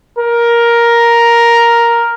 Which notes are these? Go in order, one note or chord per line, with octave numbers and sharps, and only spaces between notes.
A#4